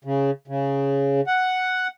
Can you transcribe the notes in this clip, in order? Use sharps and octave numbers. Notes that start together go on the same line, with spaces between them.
C#3
C#3
F#5